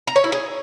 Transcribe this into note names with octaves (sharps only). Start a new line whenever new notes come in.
A#5
C#5
E4
G#4